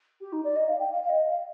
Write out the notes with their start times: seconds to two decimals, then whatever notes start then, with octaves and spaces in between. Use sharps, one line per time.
0.20 G4
0.32 D#4
0.44 D5
0.55 D#5
0.67 F5
0.79 G5
0.91 F5
1.02 F5
1.09 D#5
1.26 F5